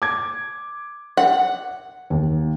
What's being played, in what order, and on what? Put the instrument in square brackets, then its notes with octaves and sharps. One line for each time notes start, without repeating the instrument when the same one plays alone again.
[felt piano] D6 G#6
[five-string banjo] F#5
[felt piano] D#2